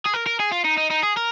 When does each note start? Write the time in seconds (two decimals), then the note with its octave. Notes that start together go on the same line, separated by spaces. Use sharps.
0.05 G#4
0.13 A#4
0.26 A#4
0.39 G#4
0.51 F4
0.64 D#4
0.77 D#4
0.90 D#4
1.03 G#4
1.17 A#4